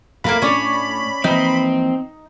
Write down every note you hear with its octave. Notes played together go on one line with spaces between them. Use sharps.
F2 A2 A3 A#3 A#4 F5 B5
A2 A3 C#4 D4 C#5 D5
E3 F3 A#3 C4 D#4